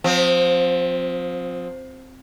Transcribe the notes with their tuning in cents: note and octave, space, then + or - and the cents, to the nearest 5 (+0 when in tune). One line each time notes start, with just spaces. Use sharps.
F3 +30 C4 +0